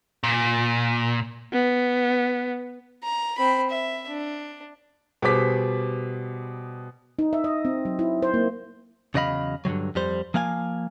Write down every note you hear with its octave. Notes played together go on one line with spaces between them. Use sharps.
A#2
B3
A#5
C4 B5
E5
D4
B2 G3 G#4 C5 D6 B6
D#4
E5
D#5
C4
F#3
E4
C5
A#3
E2 C#3 F#3 D#5 F5 B5
G2 D3 D#3 F#3
F2 G3 C5
F3 A#3 F5 F#5 G#5